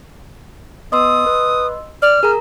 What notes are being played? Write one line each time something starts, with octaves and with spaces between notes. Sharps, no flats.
B3 D#5 C6 D#6 E6
B4
D5 F6
G#4 A#4 A#5